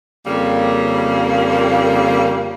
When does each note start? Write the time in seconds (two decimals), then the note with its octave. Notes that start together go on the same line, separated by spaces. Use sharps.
0.27 F2 C#3 G3 A#3